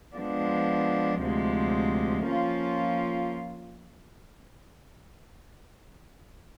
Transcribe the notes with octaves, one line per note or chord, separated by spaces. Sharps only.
F3 G#3 B3 D4
D2 C3 F3 G#3
F3 A#3 C#4 F4